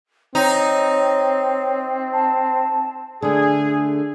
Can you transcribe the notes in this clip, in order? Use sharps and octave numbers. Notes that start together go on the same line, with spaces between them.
C4 D#4 C#5
A5
D3 A3 G#4